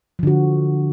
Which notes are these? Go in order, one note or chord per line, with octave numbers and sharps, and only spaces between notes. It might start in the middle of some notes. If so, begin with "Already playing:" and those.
D3 F3 F#4